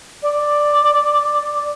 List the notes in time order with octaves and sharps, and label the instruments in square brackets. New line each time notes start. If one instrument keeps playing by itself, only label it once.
[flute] D5